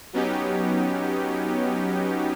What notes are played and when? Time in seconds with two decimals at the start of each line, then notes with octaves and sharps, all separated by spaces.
0.13 F#3 B3 C#4 D#4 G4